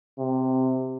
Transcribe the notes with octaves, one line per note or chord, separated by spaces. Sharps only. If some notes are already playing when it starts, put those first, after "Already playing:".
C3